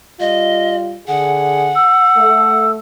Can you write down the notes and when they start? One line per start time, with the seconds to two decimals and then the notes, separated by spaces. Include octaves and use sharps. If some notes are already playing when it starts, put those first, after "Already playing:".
0.20 G3 F4 D#5
1.07 D3 G#4 F#5
1.76 E6
2.17 A3